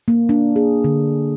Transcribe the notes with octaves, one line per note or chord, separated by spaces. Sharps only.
A#3
D4
G#4
D3